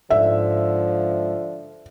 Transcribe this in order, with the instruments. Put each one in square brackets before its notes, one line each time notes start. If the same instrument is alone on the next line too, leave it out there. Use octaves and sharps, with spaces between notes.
[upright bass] G#2 [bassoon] D3 [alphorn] F3 [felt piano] E5